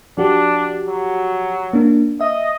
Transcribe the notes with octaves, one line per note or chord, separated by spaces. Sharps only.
F3 D4 F#4 G4
F#3
A#3 D4
D#5 E5